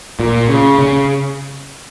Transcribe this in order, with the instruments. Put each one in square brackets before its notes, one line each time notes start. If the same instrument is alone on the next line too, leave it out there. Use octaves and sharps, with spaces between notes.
[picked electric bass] A#2
C#3
C#3